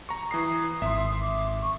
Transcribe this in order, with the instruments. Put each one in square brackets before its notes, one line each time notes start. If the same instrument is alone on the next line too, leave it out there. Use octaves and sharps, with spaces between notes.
[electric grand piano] A#5 C#6
[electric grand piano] E3 A#5 C7 [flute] D#6
[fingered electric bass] G#1 [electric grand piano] E5 C6
[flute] D6
C#6